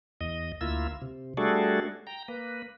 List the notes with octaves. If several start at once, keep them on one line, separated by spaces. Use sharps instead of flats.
E2 D#5
D2 A#3 E4 F4 E6
C3
G3 A3 D4 F#4 G#4 A4
G5 A#5
A#3 B4